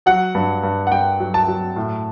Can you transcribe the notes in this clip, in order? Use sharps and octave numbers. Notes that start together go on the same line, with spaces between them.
F#3 F#5
G2
G2
F#5
G2 G5
F#3
A5
F#3
A2